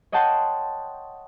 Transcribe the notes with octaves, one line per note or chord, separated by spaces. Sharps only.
C#5 D#5 F#5 G5 A5 C6